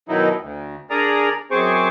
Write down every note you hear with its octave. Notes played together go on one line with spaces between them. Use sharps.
B2 D#3 F#3 D#4 E4
D2
D3 G#4 A#4 D5 A#5 D#6
F#2 C4 G#4 C5 C#6 D6